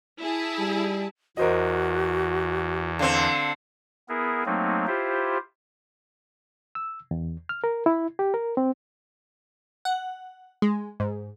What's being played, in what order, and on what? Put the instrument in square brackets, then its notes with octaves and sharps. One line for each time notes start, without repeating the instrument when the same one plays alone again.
[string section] E4 G#4 A5
[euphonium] G3
[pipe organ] E2 [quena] F#4 [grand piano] A#4 C5 D#5
[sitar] D3 C4 [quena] F5
[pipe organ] B3 E4 G#4 A#4
F#3 A3 A#3 C4 D#4
E4 F4 G4 C5
[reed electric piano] E6
E2
F6
A#4
E4
G4
A#4
C4
[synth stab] F#5
G#3
G#2